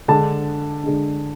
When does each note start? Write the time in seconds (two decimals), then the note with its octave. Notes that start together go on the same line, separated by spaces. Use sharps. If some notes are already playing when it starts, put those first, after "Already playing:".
0.08 D3 G#3 D4 A5
0.83 D3 G#3 D4